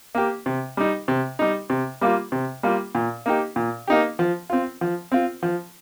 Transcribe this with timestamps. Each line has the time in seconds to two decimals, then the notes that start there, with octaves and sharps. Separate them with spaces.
0.15 A#3 G4
0.46 C3
0.77 G3 D#4
1.08 C3
1.39 G3 D#4
1.70 C3
2.01 G3 A#3 F4
2.32 C3
2.63 G3 A#3 F4
2.95 A#2
3.26 A#3 D#4 G4
3.56 A#2
3.88 A#3 D#4 G4
4.19 F3
4.50 C4 F4
4.81 F3
5.12 C4 F4
5.43 F3